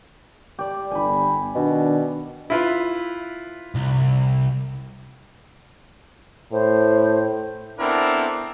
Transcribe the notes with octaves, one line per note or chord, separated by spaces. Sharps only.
G4 D5
G1 G#5 B5
B2 D#3 D4
E4 F4 B4
C2
A2 C5
B3 C4 D4 E4 A4 A#4